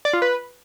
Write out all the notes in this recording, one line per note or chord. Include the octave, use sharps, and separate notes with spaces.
D5
F4
B4